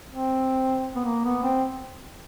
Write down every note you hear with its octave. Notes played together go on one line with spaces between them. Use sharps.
C4
B3
A#3
B3
C4